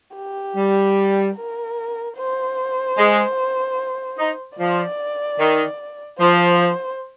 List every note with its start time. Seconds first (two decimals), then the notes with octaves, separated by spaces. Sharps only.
0.16 G4
0.56 G3
1.36 A#4
2.17 C5
2.97 G#3
4.18 D#4
4.58 F3 D5
5.39 D#3
6.19 F3 C5